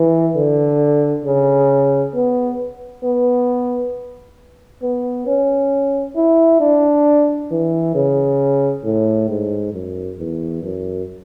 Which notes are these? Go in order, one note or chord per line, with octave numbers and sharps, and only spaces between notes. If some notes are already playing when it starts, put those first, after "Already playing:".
Already playing: E3
D3
C#3
B3
B3
B3
C#4
E4
D4
E3
C#3
A2
G#2
F#2
E2
F#2